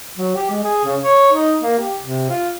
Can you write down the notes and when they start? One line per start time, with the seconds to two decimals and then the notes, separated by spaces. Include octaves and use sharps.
0.17 F#3
0.35 G4
0.50 G#3
0.64 G#4
0.85 C#3
1.02 C#5
1.33 D#4
1.60 A#3
1.79 G4
2.01 C3
2.30 F4